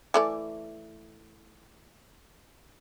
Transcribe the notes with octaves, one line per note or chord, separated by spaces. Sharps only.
E3 A3 D5